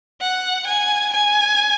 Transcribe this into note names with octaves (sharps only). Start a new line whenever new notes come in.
F#5
G#5
G#5